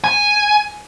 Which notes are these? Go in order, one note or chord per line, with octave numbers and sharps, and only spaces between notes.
G#5